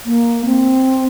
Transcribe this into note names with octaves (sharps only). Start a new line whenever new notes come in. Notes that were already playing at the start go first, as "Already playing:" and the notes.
A#3
C4